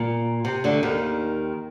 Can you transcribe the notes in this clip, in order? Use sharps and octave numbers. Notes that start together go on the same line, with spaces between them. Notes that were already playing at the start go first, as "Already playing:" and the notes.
Already playing: A#2
C3
D2 D3
D#2 D#3